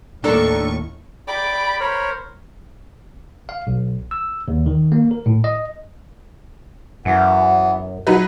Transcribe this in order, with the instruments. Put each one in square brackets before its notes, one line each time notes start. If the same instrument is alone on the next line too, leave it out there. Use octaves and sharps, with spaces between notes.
[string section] D#2 A2 C#6 [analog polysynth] D4 A4 A#4
[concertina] D5 G5 D6 [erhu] B5
[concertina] A#4 C5 C#5
[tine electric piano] F5
B1
E6
D#2
D#3
A#3
A#4
A2
D#5
[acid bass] F#2 [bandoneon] E3 B3
[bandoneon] E2 [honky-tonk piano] F#3 D#4 B4